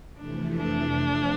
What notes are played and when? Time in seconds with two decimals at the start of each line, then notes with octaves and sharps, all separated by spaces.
0.17 F2 C3 E3 A3 D4
0.58 D4
0.98 F3 A3 C4